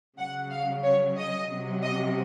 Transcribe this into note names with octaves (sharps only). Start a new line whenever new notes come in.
C#3 F#3 F#5
F5
C#5
D#5
C3 F#3
D#5